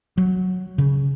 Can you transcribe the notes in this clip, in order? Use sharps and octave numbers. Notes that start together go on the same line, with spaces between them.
F#3
C#3